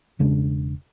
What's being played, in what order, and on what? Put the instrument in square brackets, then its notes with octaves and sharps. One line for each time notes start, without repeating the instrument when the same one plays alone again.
[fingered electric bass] E1 C#3 G#3 D4